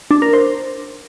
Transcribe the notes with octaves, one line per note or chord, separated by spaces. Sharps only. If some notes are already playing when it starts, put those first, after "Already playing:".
D4
A#4
C5